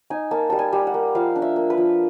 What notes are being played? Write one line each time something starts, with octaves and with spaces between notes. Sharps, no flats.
D#4 G#5
A#3 A5
G3 A5
G#5
G3
F#5
A#3
F3 F5
D4
E5
A#3
B4
F3